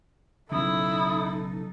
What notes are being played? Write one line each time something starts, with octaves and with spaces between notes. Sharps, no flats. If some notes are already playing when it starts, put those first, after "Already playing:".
B1 C#3 D#4 E4 A4 D#6